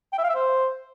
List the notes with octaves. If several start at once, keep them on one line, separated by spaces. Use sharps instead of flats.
G5
E5
F5
E5
C5